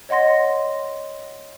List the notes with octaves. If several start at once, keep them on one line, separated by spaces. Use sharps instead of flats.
C#5 D#5 F#5 C6 A#6